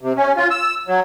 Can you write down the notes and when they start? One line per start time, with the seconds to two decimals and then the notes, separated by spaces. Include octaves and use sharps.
0.01 C3
0.16 C#4
0.36 F4
0.51 E6
0.88 F#3